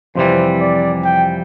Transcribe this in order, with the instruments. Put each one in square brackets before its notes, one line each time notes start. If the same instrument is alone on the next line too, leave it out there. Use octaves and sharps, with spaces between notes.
[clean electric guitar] F2 C3 E3 G3 [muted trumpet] C5
[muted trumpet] D5
G5